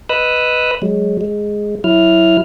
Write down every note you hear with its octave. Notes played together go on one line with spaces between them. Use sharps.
B4 D#5 B5 D#6 E6 F#6
F#3 G#3
G#3
F#3 E4 F6